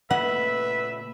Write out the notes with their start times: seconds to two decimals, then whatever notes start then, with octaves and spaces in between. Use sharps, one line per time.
0.11 A#2 C#3 A3 B4 D#5 E5 F#5